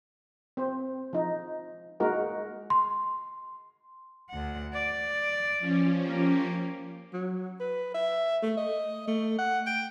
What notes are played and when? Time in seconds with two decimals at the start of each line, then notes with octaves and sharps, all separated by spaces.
0.57 C4 C5
1.13 F3 D#4
2.00 G#3 A#3 D#4 F#4 A#4
2.70 C6
4.30 D2 F#5
4.74 D5
5.60 F3 C#4
6.02 A#3 G4
7.13 F#3
7.60 B4
7.94 E5
8.43 A3
8.57 D#5
9.07 A3
9.39 F#5
9.67 G5